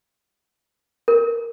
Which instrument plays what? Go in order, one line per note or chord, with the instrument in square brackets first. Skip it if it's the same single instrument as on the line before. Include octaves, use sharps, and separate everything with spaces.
[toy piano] A#4